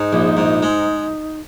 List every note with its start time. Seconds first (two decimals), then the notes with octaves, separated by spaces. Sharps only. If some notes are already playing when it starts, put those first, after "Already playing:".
Already playing: G#2 D#4
0.13 A#1
0.37 G#2
0.63 G#3